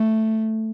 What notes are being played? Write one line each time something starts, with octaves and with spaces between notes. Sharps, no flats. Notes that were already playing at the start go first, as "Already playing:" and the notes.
Already playing: A3